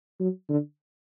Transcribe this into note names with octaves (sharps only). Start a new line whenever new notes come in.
F#3
D3